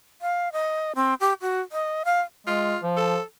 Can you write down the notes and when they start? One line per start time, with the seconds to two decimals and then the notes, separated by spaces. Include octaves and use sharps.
0.22 F5
0.52 D#5
0.96 C4
1.20 G4
1.41 F#4
1.72 D#5
2.05 F5
2.47 G#3 F4
2.83 F3
2.97 A4